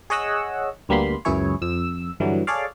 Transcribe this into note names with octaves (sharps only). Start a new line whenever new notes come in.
G#4 C#5 D#5 F#5 E6
D2 G3 A#3 B3 B5 C6
C#2 F#2 E3 E4 G#4 C#5
F2 E6
G2 D3 E3 F#3
G#4 A4 C#5 D5 F5